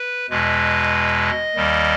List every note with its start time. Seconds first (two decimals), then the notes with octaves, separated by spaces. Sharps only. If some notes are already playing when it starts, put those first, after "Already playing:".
Already playing: B4
0.30 E2 B2 G#3 B4
1.24 D#5
1.55 D#2 D#3 G3